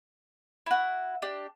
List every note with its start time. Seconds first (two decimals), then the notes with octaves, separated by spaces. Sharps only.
0.66 E4 F#4
1.22 D4 G4